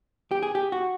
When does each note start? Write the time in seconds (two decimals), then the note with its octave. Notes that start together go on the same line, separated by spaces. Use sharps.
0.31 G4
0.43 G#4
0.55 G4
0.72 F#4